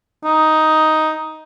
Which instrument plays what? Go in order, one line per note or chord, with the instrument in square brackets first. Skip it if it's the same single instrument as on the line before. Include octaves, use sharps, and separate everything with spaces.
[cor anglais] D#4